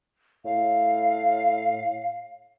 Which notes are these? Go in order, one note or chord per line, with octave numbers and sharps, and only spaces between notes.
A2 F5